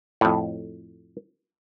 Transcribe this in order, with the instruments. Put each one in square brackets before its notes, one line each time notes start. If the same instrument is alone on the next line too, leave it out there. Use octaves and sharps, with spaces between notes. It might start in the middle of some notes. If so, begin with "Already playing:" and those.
[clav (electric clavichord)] F2 A2